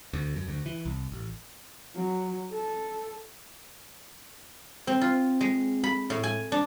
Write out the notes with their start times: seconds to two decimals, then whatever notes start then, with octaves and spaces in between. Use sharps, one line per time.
0.13 D2
0.36 F#2
0.48 D2
0.66 E3
0.85 C2
1.12 A1
1.95 F#3
2.52 A4
4.87 C4
5.01 F4
5.41 G#3
5.84 B5
6.10 A2
6.23 G#5
6.52 D4